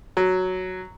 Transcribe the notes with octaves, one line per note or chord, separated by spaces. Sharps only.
F#3